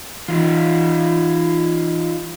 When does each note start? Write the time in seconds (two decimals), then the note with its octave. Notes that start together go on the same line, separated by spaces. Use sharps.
0.28 E3 D#4 F4